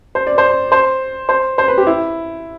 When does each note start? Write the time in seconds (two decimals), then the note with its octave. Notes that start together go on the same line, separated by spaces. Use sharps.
0.15 C5
0.27 D5
0.38 C5
0.72 C5
1.29 C5
1.58 C5
1.68 B4
1.78 G4
1.87 E4